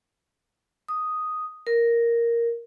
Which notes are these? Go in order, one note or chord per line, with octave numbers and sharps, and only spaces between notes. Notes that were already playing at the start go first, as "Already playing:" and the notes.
D#6
A#4